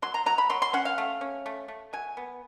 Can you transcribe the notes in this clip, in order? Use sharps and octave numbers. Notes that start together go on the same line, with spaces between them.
F#3 C6
A#5
F#3 A#5
B5
F#3 C6
C6
C#4 F#5
F5
A3
C#4
A3
A3
F#3 G#5
B3